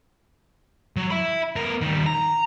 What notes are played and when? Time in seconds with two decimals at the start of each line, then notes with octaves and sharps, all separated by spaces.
0.96 F#3
1.11 E5 B5
1.56 B3 A#4
1.82 D#3 G3
2.06 A#5